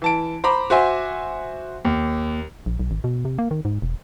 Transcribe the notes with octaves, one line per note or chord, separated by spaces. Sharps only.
E3 A5 D7
C5 A#5 B5 D6
F#4 C5 E5 G#5
D#2
A#1
B1
G#1
B2
C3
A#3
D#3
G#2
E1